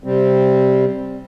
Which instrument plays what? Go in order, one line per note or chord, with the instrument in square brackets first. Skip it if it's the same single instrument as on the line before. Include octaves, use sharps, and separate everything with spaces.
[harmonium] C3 G3 C4